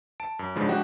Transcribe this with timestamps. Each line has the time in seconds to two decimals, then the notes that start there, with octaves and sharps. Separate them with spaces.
0.20 A5 D7
0.39 F#2
0.55 G#2 C#3 F3 G#3 D4
0.68 F3 G#3 D4 F#4 G4